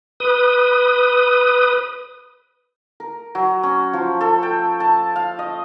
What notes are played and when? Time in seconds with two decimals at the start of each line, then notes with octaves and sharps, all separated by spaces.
0.20 B4 D#6
3.00 A#4
3.35 F#3
3.63 C#4
3.93 F3
4.21 A4
4.43 G5
4.80 A5
5.16 F5
5.39 D#5